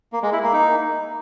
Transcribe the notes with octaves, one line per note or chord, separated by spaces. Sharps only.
A#3
G#3
E4
A#3
D#4